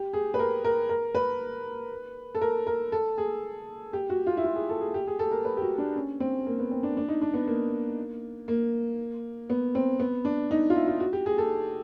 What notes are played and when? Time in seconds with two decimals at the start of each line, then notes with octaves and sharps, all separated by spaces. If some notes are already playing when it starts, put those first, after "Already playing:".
Already playing: G4
0.13 G#4
0.34 B4
0.39 A#4
0.65 A#4
0.89 A#4
1.15 B4
2.35 A4
2.41 A#4
2.67 A#4
2.92 A4
3.18 G#4
3.93 G4
4.10 F#4
4.27 F4
4.37 E4
4.44 F4
4.56 G#4
4.69 A4
4.81 G#4
4.94 G4
5.07 G#4
5.19 A4
5.31 A#4
5.45 B4
5.57 G4
5.62 F#4
5.78 D4
5.96 C#4
6.20 C4
6.46 A#3
6.59 B3
6.71 C4
6.83 D4
6.97 D4
7.08 D#4
7.21 D4
7.34 B3
7.47 A#3
8.48 A#3
9.50 B3
9.75 C4
9.99 B3
10.25 D4
10.51 D#4
10.70 F4
10.75 E4
10.88 F4
11.00 F#4
11.13 G4
11.26 G#4
11.38 A4